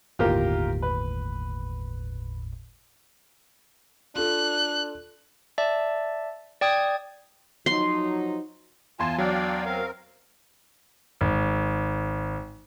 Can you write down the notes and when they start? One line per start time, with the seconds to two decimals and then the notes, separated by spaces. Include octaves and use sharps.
0.19 G1 D#2 A2 F4 G4 A#4
0.82 B4
4.16 D4 F4 A4 F#6
5.58 D5 E5 A5
6.61 D5 G5 D#6 G#6
7.66 F3 F#3 D#4 C6
8.99 E2 F4 G#5 A5 C6
9.18 F#3 D4 D5 F5 G5
9.66 C4 A#4 F5
11.21 G#1